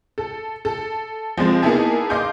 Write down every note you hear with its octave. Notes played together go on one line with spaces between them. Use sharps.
A4
A4
F3 G#3 C4
A#3 B3 D#4 E4 G#4 A5
D#5 F5 C6 D6 G6